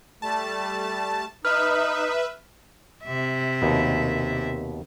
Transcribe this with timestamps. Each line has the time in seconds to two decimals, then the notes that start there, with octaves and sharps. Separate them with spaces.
0.22 G3 A3 A5
1.45 D#4 B4 E5 F6
3.04 C3 E5
3.62 D#2 B2